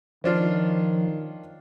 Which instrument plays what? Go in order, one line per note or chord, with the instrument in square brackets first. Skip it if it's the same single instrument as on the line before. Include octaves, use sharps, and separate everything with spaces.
[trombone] D#3 [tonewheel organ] F3 [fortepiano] C#4 D4 F4